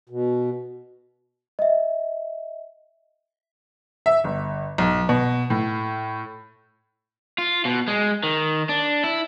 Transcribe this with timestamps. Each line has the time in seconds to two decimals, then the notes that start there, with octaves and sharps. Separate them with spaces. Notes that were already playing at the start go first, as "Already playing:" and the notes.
0.10 B2
1.59 D#5 E5
4.06 E5
4.24 G1
4.78 B1
5.09 B2
5.50 A2
7.38 F4
7.65 B2
7.88 G#3
8.23 D#3
8.69 D4
9.04 E4